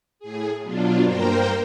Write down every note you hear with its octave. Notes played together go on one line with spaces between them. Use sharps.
A2 G#4
B2 F#3 D4 F4
G2 A#3 A#4 C5 G5